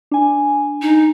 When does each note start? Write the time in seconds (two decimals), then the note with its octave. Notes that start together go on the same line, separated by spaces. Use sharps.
0.12 D4 G#5
0.82 D#4